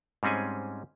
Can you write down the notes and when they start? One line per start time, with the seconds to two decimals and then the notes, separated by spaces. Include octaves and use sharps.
0.23 G#2 G3 C4 C#4 G#4 G#5